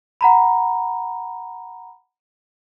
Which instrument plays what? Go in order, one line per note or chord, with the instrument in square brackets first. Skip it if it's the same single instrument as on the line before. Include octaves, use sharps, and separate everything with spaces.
[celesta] F#5 A#5 B5